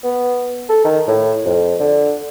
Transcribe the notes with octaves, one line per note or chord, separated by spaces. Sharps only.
B3
A4
D#3
A2
F2
D3